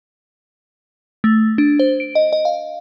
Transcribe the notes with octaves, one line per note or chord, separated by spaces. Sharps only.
A3
D4
C5
D7
D#5
D#5
F5